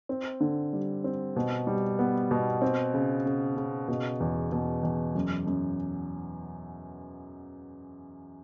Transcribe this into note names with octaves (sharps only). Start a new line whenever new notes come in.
C4
D3
G3
C4
B2
G3
B3
B2
C4
C#3
C#3
C#3
B2
E2
B2
E2
F#2
F#2